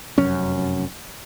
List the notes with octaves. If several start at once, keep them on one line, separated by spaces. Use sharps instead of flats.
F1 F#2 C#4